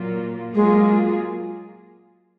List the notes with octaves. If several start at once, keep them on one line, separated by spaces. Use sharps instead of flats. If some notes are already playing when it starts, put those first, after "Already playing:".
Already playing: A#2 F#3 A#3 F4
F#3 G#3 A#3 F4 G#4